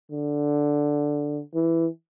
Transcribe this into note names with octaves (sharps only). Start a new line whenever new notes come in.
D3
E3